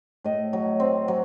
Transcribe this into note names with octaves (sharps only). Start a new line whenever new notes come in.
A2 D#5
F#3
C4
F#3